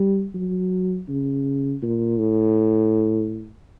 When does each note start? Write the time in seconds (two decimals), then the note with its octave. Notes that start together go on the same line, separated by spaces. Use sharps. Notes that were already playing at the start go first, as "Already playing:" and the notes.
Already playing: G3
0.35 F#3
1.08 C#3
1.82 A#2
2.19 A2